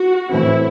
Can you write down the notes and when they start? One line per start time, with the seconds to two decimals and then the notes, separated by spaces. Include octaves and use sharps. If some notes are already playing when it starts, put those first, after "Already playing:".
Already playing: F#4
0.29 A2 E3 C4 E4